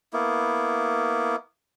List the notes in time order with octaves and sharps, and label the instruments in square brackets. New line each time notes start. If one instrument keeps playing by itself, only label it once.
[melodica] A#3 B3 E4